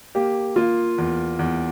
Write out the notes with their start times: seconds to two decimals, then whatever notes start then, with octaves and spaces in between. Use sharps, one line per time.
0.15 A#3 G4
0.56 A#3 F4
0.98 E2
1.39 E2